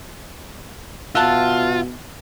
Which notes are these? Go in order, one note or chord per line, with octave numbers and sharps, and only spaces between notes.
B2 F4 E5 F#5 A5